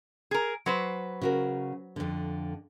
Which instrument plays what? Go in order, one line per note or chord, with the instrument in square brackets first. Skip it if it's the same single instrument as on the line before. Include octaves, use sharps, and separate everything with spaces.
[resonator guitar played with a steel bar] G#4 A#4
F#3 B4 C5
[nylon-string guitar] C#3 F#4 A#4
F2 D3